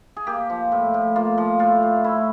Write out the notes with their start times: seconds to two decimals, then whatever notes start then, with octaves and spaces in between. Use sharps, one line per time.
0.16 G#4
0.27 A#3 G4
0.50 F3
0.72 A2
0.94 A2
1.16 A#3 F4
1.38 F3
1.59 A2 F4
1.83 A2
2.04 A3 E4